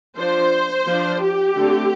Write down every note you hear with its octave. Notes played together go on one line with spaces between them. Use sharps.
F3 D4 C5
F3 D4
G4
D3 A3 C4